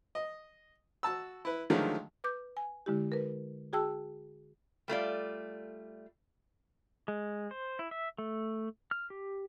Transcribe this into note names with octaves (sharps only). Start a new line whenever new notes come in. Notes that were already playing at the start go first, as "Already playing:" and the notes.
D#5
F#4 A5 E6
E4 B4
D3 D#3 F3 F#3 G#3 A3
B4 D6 G6
G#5
D3 G#3 E4 G4
A#4 B4
F#4 G#4 G5 A5 E6
G3 A3 F4 D5
G#3
C5
E4
E5
A3
F6
G4